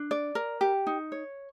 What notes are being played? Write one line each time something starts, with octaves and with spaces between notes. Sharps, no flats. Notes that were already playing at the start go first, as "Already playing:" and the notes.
Already playing: D4
D5
A#4
G4
D#4
C#5